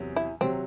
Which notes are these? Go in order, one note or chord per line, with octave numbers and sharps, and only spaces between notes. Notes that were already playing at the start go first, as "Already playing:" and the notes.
Already playing: E2 C3 F#3
E4
C3 F#3 C4